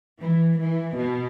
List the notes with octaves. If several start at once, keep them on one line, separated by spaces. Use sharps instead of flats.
E3
E3
B2